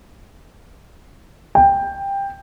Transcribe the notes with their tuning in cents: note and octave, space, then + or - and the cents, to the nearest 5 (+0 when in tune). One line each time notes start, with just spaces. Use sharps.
G5 +15